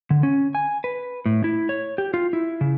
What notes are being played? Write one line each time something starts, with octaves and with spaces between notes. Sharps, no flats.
D3
C#4
G#5
B4
A2
E4
C#5
G4
F4
E4
C#3